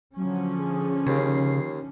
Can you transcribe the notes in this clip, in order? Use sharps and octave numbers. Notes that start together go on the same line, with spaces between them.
D3 F3 F#3 C#4
G#4
D#2 C#3 D6 C7